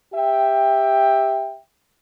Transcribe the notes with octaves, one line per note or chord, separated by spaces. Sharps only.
G4 E5 G5